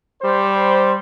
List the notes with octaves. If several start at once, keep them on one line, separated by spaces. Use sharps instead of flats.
G3 C5